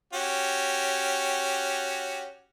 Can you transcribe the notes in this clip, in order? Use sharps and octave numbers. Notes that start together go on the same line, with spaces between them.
C#4 F#4 G4